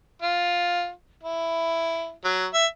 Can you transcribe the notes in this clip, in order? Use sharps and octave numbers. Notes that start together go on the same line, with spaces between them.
F4
E4
F#3
E5